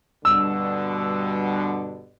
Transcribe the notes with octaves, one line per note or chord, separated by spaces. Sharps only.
G2 B2 D3 E6